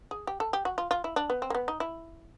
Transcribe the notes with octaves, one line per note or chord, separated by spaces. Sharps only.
G#4
G4
A4
G4
F#4
F4
F4
E4
D4
B3
C4
A#3
B3
D#4
E4